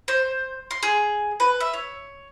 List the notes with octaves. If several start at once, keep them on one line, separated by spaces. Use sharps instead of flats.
C5
C6
G#4
B4
E5
C#5